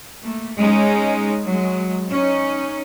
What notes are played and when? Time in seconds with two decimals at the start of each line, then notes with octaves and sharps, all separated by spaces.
0.21 A3 A#3
0.57 G#3 C#4 D#4
1.44 F#3 G#3
2.09 C#4 D#4